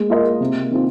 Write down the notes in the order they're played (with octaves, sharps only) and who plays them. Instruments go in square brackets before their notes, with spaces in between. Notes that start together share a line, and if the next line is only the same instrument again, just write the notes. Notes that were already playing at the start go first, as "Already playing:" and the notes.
Already playing: [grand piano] G#3 [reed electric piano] A#3
[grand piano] F4 A#4 D#5
C3
D#3 C4 F4